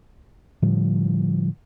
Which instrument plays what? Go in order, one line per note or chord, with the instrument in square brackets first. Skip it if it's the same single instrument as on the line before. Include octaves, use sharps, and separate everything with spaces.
[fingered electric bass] A2 D3 F3 G3